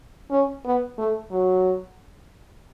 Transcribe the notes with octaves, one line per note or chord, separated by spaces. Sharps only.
C#4
B3
A3
F#3